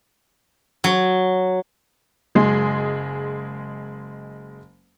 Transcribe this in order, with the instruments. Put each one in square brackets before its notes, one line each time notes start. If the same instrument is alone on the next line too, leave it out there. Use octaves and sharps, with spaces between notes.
[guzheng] F#3
[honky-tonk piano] F#1 G#3 G#4 C6